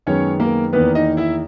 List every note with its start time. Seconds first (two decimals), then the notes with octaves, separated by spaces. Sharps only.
0.07 F#2 D#3 G#3 B3 C#4 C#5
0.40 A#3 A#4
0.73 E2 D#3 A#3 B3 B4
0.95 D#4 D#5
1.17 E4 E5